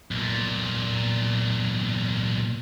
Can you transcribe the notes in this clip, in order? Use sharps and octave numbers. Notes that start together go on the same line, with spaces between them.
B1 A#2